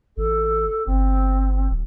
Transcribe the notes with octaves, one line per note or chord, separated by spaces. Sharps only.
A1 A4
G1 C4
D1